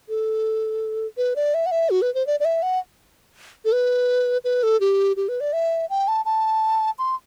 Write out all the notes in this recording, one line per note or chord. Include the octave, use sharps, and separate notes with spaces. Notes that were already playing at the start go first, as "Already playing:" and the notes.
A4
B4
D5
E5
F#5
E5
F#4
B4
C5
D5
D5
E5
F#5
A4
B4
B4
A4
G4
G4
B4
D5
E5
G5
A5
A5
C6